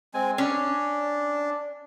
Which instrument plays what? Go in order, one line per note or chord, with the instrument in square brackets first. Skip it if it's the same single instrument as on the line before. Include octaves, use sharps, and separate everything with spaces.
[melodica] G#3 C4 G#5
[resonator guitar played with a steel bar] C#4 [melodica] D4